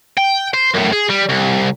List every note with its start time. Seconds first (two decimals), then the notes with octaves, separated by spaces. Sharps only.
0.17 G5
0.54 C5
0.74 F#2 A2
0.93 G#4
1.09 G3
1.29 C2